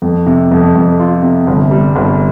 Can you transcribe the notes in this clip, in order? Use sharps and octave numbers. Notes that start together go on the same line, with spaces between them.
F2
C3
F2
F2
F4
C3
G1
G3
G1